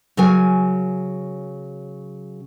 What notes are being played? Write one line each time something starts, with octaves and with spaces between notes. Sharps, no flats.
C#3 F#3 A#4 G#5